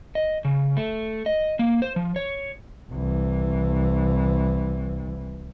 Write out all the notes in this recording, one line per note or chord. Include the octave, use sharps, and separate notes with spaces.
D#5
C#3
A3
D#5
A#3
C5
F3
C#5
C2 E3